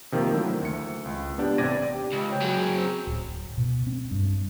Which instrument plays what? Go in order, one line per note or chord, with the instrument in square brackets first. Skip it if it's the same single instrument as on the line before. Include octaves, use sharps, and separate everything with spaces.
[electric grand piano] C3 D#3 F3 A#3
D3 D#3 F#3 A3 D#4 E4
D2 C#7
C#2
B3 D4 G4
A1 C3 D5 G#6 A#6 D#7
[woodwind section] G4
[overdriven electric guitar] C#2
[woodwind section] C4 C#5 G5
[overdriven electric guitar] F#3 G#4
[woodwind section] C4
[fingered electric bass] D1
B2
C4
G2